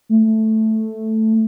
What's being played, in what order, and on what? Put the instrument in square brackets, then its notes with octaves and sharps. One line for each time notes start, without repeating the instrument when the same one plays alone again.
[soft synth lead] A3